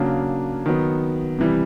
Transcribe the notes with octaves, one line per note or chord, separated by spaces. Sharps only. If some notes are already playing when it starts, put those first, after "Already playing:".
Already playing: C#3 F#3 A#3 D4
D#3 F#3 B3
C3 E3 G3